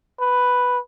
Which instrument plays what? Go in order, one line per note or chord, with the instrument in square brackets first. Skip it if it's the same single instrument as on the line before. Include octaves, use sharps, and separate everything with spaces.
[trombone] B4